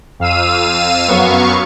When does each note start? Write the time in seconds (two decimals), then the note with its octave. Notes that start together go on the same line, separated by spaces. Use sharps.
0.19 F2 F5 E6 D#7
1.08 F#2 F#3 B3 F5 C#6